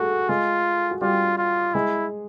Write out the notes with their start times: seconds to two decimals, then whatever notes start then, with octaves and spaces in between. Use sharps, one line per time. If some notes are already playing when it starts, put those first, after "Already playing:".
Already playing: A3 F#4 G#4 A4
0.29 G#3 F4 G#4
0.91 F#4
1.01 G3 F4 G4
1.38 F4
1.74 G#3 E4 G#4